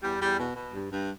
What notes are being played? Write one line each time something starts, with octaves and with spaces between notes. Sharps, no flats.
E2 G3
E2 G3
B2
B2
G2
G2